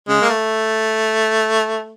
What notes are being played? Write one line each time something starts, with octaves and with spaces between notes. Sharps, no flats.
C#3 G#3
A#3
A3